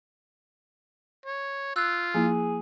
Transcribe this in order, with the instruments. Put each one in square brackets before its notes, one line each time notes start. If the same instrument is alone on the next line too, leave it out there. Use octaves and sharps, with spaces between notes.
[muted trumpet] C#5
[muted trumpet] F4 [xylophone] E6 F#6
[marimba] F3 A#3 E4 [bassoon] G#4